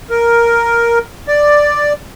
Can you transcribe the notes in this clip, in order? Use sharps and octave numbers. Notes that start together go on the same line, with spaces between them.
A#4
D5